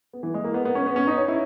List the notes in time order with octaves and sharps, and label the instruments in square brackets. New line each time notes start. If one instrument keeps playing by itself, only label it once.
[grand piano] B3
E3
G#3
A#3
B3
B3
C#4
B3
C#4
D#4
C#5
E4